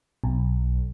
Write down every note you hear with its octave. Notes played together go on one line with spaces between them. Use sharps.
B1